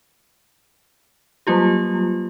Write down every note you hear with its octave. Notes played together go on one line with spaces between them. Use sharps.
F#3 G3 A#3 F4 G4